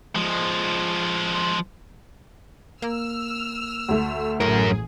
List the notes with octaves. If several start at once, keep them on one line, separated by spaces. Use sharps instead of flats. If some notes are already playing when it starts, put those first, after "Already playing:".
F3 G#3
A#3 E6 F6
D2 A3
A1 F#2 A2 G#4 A#4